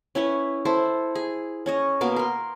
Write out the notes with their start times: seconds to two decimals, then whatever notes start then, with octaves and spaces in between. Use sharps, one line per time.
0.15 C#4 E4 B4 C#5
0.65 E4 A4 C5
1.15 G#4
1.66 C#4 C#5 D#5
2.01 B2 A#3 B3 D6
2.16 A#4 C6